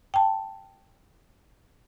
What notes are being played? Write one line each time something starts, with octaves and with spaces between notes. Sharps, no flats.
G5 A5